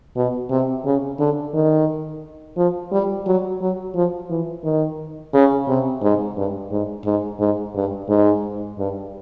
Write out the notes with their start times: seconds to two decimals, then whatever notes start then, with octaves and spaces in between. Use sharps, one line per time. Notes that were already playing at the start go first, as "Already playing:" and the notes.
0.16 B2
0.50 C3
0.85 C#3
1.19 D3
1.54 D#3
2.57 F3
2.92 G3
3.26 F#3
3.61 F#3
3.95 F3
4.30 E3
4.64 D#3
5.33 C#3
5.68 C3
6.02 G#2
6.37 G2
6.71 G#2
7.05 G#2
7.40 G#2
7.75 G2
8.09 G#2
8.79 G2